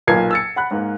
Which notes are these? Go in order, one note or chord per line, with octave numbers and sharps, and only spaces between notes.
B1 A#2 A#4 B4 G#6 C7
E6 A6 C#7
F#5 B5 F#6
G#2 A#3 A#4